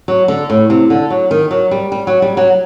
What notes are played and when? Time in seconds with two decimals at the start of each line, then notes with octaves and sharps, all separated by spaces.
0.08 F#3
0.28 D3
0.50 A2
0.70 C3
0.90 D3
1.10 F#3
1.31 D#3
1.51 F#3
1.71 G3
1.92 G3
2.07 F#3
2.22 G3
2.37 F#3